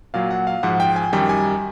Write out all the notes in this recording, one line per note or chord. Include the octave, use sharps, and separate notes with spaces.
A#2 F#3 F5
F#5
F5
G#2 F3 F#5
G5
G#5
F#2 D#3 G3 G5
G#5